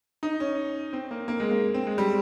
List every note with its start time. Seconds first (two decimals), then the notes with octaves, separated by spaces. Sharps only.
0.23 D#4
0.40 C#4
0.93 C4
1.11 A#3
1.28 A#3
1.40 G#3
1.51 A#3
1.74 C4
1.87 G#3
1.98 G3